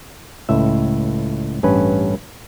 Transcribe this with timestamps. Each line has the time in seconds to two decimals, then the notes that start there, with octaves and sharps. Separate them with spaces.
0.49 C#2 A2 E5
1.63 A1 G2 C#4 B4